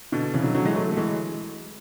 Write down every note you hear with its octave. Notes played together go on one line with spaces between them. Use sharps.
B2 D3
C#3 E3
D3 F#3
D3 F#3
E3 G#3
F#3 A3
A3
E3 G#3